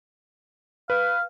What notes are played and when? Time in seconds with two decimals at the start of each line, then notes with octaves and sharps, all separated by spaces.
0.90 B4 F5